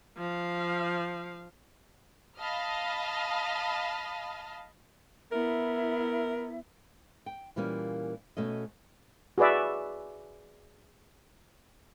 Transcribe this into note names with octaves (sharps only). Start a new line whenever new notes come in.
F3 F5
D#5 F5 A5 B5 D#6 F6
B3 E4 A#4 E5
G5
A#2 E3 G3 A#3 C#4
B2 A3 C#4 D#5
F#4 G#4 B4 D5 E5